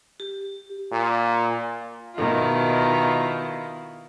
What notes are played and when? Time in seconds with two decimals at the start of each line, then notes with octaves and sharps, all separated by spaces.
0.20 G4
0.92 A#2
2.16 B2 D#3 E4 F4